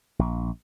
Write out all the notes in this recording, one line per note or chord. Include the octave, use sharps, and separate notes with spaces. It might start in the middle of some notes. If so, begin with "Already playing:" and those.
A#1